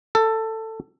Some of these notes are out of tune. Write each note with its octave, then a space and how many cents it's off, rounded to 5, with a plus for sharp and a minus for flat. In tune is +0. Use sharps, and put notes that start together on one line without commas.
A4 +15